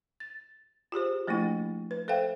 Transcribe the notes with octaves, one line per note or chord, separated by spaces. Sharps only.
A6
F4 G4 G#4 C5
F3 A3 A#3 D4 E4
B4
A4 C5 E5 F5 G5